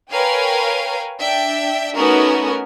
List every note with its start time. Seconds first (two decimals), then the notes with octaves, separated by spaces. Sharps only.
0.11 A#4 B4 C#5 F5 G5 G#5
1.19 D4 E5 G5
1.96 A3 B3 C#4 D#4 F#4 A#4